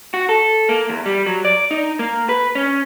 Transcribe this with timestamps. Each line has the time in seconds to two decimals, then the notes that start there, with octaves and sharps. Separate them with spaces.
0.14 F#4
0.29 A4
0.69 A#3
0.89 E2
1.06 G3
1.27 F#3
1.45 D5
1.71 D#4
1.99 A#3
2.29 B4
2.55 C#4